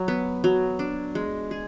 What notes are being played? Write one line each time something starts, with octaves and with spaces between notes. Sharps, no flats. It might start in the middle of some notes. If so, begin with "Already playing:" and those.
Already playing: F#3
B3
F#3
D4
G#3
G#4